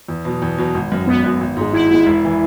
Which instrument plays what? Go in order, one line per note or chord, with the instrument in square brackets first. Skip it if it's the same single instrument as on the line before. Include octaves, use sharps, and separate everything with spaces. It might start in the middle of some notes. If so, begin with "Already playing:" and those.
[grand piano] E2
B2 F#3
E2
B2 F#3
G#1
F#2 F#3
[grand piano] G#1 [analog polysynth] B3
[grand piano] F#2 F#3
G#1
G#2 G#3
[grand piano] G#1 [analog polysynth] E4
[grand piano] G#2 G#3 [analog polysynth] E4
[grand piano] E1
E3